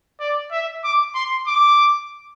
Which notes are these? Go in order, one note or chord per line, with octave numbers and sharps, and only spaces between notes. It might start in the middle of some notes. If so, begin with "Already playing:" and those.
D5
E5
D6
C6
D6